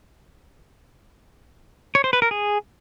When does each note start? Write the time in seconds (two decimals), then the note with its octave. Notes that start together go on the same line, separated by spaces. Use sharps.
1.95 C#5
2.04 C5
2.13 B4
2.22 A#4
2.31 G#4